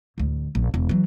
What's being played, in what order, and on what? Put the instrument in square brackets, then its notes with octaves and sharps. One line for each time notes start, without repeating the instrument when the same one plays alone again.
[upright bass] A1 D2
A#1
E1
E3 F#3